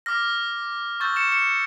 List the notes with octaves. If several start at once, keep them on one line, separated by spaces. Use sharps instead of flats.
D6 F6 A#6
C#6 E6 G6 A6
C#7 E7
C#7 E7